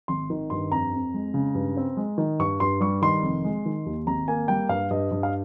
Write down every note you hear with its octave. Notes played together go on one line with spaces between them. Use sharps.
G#1 C6
D#3
G2 C6
F2 A#5
F2
G#3
C#3
G2
C4
G#3
D#3
G2 C#6
G2 C6
G3 C#6
D#3 C6
F1
G#3
D#3
D#2
G#1 A#5
A#3 G#5
G3 G5
G2 F5
G2 D#5
G2
F5